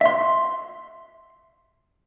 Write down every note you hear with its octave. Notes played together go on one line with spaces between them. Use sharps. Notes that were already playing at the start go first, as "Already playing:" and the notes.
E5 C6